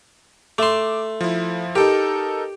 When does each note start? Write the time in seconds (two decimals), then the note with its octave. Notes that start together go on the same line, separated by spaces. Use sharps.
0.58 A3 C6 D6 E7
1.21 F3 E4
1.76 D#4 G4 A4 A#4